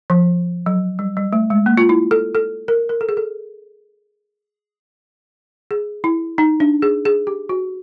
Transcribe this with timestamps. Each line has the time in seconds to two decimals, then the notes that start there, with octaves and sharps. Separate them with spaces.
0.10 F3
0.66 F#3
0.99 G3
1.17 G3
1.33 A3
1.50 G#3
1.66 A#3
1.77 F4
1.89 E4
2.11 A4
2.35 A4
2.68 A#4
2.89 A#4
3.01 A4
3.09 G#4
3.17 A4
5.71 G#4
6.04 E4
6.38 D#4
6.60 D4
6.82 G#4
7.05 G#4
7.27 G4
7.49 F#4